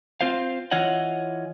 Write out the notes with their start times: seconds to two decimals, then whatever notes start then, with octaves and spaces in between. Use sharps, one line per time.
0.21 C4 F4 C5 F5
0.71 E3 F4 C#5 D#5 F#5